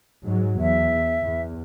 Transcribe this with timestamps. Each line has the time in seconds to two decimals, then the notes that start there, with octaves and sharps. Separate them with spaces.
0.24 G#2 F#3
0.60 E2 E5
1.20 E2